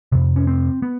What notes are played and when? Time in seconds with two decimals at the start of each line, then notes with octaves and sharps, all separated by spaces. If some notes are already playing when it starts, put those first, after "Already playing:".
0.12 F2 C3
0.36 C#4
0.47 C4
0.82 B3